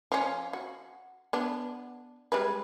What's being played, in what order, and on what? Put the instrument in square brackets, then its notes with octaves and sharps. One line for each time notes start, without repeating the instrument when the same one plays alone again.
[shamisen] F3 C#4
F#4
B3 D4
G3 G#3 B4